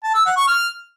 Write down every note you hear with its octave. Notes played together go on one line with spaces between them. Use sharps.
A5
E6
F#5
C#6
F6